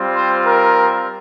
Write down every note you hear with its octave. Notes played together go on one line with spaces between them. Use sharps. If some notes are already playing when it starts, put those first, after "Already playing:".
Already playing: G3 C4 F4
C5
A#4